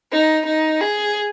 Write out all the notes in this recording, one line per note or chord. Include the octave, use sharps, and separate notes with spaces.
D#4
D#4
G#4